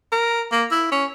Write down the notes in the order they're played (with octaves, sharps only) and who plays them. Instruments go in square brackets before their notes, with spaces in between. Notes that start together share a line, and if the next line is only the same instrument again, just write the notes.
[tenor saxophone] A#4
A#3
E4
C#4